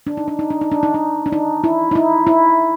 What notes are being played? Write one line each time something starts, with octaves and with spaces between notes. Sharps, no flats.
D4
D#4
D4
D#4
D4
D#4
D4
D#4
D4
D4
D#4
E4
D#4
E4
E4